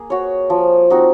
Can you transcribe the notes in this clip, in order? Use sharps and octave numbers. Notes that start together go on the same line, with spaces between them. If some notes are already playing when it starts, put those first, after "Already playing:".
Already playing: A#3 G#4
F#4 C#5
F3
C4 D#4 F#4